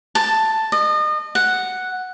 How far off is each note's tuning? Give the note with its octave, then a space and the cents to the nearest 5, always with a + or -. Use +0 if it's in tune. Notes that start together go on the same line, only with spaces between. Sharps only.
A5 +5
D#5 -35
F#5 +0